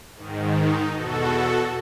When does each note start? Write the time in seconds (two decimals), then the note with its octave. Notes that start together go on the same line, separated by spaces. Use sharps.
0.15 G#2 D#3
0.53 D#4
0.91 E2 B2 F#4 A4